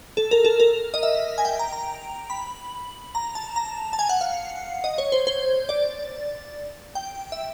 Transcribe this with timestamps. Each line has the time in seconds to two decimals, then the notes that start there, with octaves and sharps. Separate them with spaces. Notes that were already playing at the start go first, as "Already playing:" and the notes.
0.17 A4
0.31 A#4
0.45 A4
0.60 A#4
0.94 D#5
1.03 E5
1.38 G#5
1.45 G5
1.59 A#5
1.72 A#5
2.30 B5
3.15 A#5
3.35 A5
3.56 A#5
3.93 A5
3.99 G#5
4.09 F#5
4.21 F5
4.84 D#5
4.98 C#5
5.12 C5
5.27 C5
5.69 D5
6.95 G5
7.32 E5